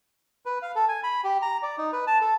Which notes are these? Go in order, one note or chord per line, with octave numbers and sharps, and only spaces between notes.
B4
F5
A4
G#5
B5
G4
A#5
D5
D#4
B4
A5
A4